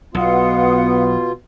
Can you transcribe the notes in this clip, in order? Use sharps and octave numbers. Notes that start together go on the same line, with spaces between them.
B1 B2 B3 F4 F5 F#5 D#6